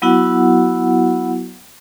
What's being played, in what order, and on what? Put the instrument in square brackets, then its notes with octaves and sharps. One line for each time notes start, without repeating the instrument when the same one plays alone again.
[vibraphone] F#3 B3 E4 F#4 F#5